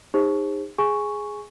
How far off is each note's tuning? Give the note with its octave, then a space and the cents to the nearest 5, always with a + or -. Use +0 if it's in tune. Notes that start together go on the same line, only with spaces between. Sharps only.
D#4 +0 G#4 -45 C5 +25
G#4 +0 G#5 +0 C#6 +0